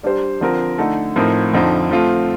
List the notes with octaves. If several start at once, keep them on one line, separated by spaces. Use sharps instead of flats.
G3 D4 G4 C5
D3 F3 C4 F4 A#4
D3 A3 D#4 A4
A2 F3 C4 D#4 A#4
F2 D3 F3 C4 D#4
F3 A3 C4 F4